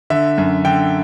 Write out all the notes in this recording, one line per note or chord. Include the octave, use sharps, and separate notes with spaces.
D3 E5
F#2
D3 G5